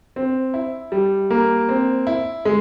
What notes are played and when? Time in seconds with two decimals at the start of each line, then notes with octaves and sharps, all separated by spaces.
0.16 C4
0.54 E4
0.92 G3
1.30 A#3
1.69 C4
2.07 E4
2.45 G#3